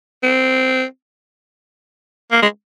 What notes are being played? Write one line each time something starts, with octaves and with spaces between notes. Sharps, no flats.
C4
A#3
G#3